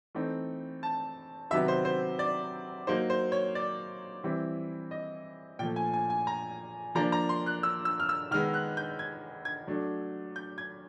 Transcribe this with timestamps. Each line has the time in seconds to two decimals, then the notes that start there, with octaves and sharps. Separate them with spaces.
0.15 E3 A3 C4 D#4
0.83 A5
1.50 C3 D#3 F#3 B3 E5
1.68 C5
1.85 C5
2.19 D5
2.87 F#3 A#3 D#4 C5
3.10 C5
3.32 C#5
3.55 D5
4.23 E3 G3 C4 E4
4.91 D#5
5.59 A#2 G5
5.62 F3 A3
5.76 G#5
5.94 G#5
6.10 G#5
6.27 A#5
6.95 F3 A#3 D4 A#5
7.12 A#5
7.29 C6
7.46 F#6
7.63 E6
7.85 E6
8.00 F6
8.09 E6
8.31 D#3 G#3 B3 F6
8.54 F#6
8.77 G6
8.99 G#6
9.45 G#6
9.67 F#3 A3 D4
10.36 G6
10.58 G#6